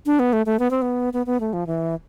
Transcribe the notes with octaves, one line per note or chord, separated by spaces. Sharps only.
D4
B3
A3
A3
B3
C4
B3
B3
B3
A3
F3
E3